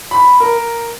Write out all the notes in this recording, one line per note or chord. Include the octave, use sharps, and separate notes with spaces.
B5
A#4